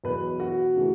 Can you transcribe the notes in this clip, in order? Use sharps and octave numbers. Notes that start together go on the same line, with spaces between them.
E2 B2 F#3 B3 B4
F#4
C#3 E3 A3